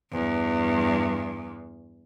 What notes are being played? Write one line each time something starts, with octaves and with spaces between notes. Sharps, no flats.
E2 G2